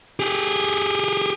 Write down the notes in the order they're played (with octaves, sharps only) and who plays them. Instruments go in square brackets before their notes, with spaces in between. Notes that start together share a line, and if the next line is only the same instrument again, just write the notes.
[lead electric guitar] G4 G#4